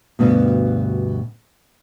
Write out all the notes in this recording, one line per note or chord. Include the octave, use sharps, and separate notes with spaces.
D2 G2 B2